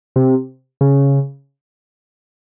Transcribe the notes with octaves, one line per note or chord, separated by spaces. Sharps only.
C3
C#3